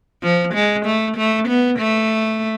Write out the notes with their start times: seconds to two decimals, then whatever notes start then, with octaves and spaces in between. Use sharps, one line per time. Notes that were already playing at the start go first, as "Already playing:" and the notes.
0.23 F3
0.54 G#3
0.86 A3
1.17 A3
1.48 B3
1.79 A3